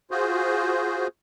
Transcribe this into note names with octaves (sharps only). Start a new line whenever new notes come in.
F4 F#4 G#4 C5